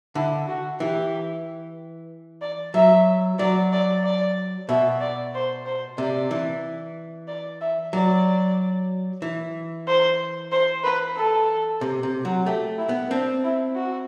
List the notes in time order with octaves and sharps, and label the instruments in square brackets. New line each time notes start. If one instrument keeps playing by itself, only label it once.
[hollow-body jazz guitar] D3 [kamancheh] E4
[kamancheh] F#4
[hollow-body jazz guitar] E3 [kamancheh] G4
[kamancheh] D5
[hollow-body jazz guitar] F#3 [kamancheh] E5
[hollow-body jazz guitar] F#3 [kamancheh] D5
[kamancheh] D5
D5
[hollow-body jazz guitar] B2 [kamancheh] E5
[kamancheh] D5
C5
C5
[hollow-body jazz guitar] C3 [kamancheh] D5
[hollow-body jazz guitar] E3
[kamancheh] D5
E5
[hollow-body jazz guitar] F#3 [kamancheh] D5
[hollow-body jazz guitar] E3
[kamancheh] C5
C5
B4
A4
[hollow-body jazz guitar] C3
C3
F#3
[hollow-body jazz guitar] A3 [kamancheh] G4
[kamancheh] E4
[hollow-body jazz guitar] B3
[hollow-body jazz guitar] C4 [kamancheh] D4
[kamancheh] E4
F#4